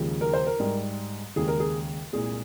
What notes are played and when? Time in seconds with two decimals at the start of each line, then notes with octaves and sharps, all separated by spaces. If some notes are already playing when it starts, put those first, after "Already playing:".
Already playing: D#2 C#3 F3 G#3
0.21 A#4
0.33 C5
0.46 A#4
0.60 G#2 G3
1.36 D#2 C#3 G#3 G#4
1.48 A#4
1.60 G#4
2.13 C2 A#2 G#3 G#4